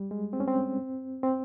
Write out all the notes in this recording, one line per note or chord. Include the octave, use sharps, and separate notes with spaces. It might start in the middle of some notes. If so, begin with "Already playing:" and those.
Already playing: G3
G#3
C4
C#4
C4
C4